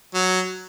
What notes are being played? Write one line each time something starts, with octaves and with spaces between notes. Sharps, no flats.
F#3